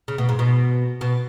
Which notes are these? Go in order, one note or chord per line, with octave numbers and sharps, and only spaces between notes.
C#3
B2
G#2
B2
B2